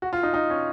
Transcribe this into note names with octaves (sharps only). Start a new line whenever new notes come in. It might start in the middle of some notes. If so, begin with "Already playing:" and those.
F#4
F4
D#4
D#4
C#4